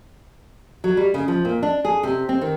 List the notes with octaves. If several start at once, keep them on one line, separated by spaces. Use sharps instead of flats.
F#3
G3
C#3
F3
A#2
D4
G#4
C3
C4
D#3